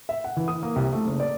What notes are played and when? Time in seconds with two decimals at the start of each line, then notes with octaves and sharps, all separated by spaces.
0.09 E5
0.24 F#5
0.37 E3
0.48 D#6
0.63 A#3
0.76 C2
0.93 A3
1.06 F#1
1.20 D5